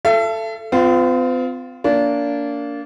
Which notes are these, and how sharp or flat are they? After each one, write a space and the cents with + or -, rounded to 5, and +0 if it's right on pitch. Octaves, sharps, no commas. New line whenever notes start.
A4 +0 E5 +40
C4 -45 F4 +0
A#3 -10 D4 -25